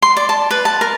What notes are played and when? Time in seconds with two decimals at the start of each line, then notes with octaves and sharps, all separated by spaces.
0.02 C6
0.17 D5
0.29 A5
0.51 B4
0.65 A5
0.81 A#4